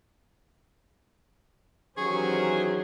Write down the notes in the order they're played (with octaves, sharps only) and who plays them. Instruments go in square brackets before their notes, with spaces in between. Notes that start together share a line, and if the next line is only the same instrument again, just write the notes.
[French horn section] D#3 E3 F#3 [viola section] C#4 G4 C5 [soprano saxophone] G#4 [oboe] C#6